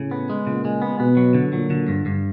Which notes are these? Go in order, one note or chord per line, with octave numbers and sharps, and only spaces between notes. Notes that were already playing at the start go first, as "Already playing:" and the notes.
Already playing: A2 C#3
B3
G#3
A#2 C#3
G#3
B3
B2 B3
F#3
D3
A#2 F#3
D3
G2
G2